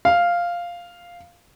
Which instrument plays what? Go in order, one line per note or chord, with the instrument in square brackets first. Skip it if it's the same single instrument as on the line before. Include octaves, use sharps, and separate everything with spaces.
[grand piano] F5